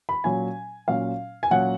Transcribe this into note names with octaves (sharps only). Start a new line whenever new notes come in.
B5
A#2 F#3 C#4 G#5
A#2 F#3 C#4 F5
G#5
A#2 F#3 C#4 F#5